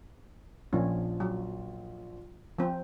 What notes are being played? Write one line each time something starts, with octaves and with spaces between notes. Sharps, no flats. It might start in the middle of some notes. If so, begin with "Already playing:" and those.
A#1 F3 C#4
F#3
F3 C4